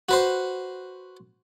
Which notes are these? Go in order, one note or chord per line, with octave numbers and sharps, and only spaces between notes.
F#4 B4 C5